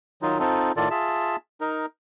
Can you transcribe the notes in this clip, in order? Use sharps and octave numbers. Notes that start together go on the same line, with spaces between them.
D#3 F#3 D#4 F4
C4 D#4 F4 A4
A2 D#3 F4 A4 D5
F4 G#4 E5 A5
D#4 A#4